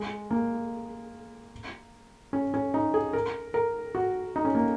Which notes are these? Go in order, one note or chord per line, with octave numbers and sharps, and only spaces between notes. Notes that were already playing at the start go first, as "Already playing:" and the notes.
Already playing: G#3
A#3
C#4
C#4
D#4
G#4
A#4
A#4
F#4
D#4
C#4
A#3